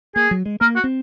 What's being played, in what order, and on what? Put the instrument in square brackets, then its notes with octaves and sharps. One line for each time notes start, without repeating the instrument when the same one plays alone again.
[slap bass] A#3 [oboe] G#4
[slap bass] F#3
G#3
[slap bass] A#3 [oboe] A#4
[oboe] F#4
[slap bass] C4